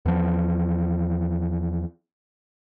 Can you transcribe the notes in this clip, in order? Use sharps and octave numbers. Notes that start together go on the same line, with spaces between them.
E2 F3